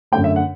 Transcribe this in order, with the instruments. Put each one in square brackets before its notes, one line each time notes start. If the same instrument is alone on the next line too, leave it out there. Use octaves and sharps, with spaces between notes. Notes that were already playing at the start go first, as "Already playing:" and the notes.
[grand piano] F#2 D3 A3 G5
E5
F#5